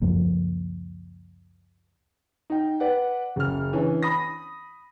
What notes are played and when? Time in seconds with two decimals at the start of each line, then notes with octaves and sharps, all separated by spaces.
0.02 C#2 F#2 F3 A#3
2.50 D#4 G5
2.80 B4 D5 F#5
3.36 F#1 C#3 F6
3.73 E3 C#4 D4
4.03 B5 D#6 A#6